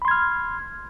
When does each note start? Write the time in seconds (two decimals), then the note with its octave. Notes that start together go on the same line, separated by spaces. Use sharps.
0.02 B5
0.05 C6
0.08 G#6
0.11 F6